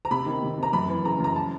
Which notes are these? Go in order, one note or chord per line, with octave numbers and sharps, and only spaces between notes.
A#5
C3 B5
D#3
C3
C3 A#5
F#2 B5
E3
C#3 A#5
F#2 A#5
A5